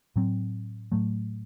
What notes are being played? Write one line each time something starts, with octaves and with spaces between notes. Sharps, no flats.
A2 F#3 C4
A2 F#3 A3